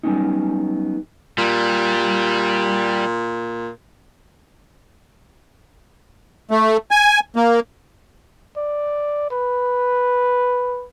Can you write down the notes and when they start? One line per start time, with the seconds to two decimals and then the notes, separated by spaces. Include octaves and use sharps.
0.03 F#3 G3 A3 B3 C#4 D#4
1.38 A#2 G3
6.51 A3
6.91 G#5
7.36 A#3
8.57 D5
9.30 B4